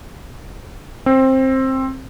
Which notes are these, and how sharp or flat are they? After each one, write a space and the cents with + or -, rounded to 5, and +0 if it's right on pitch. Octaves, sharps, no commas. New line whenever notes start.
C4 +15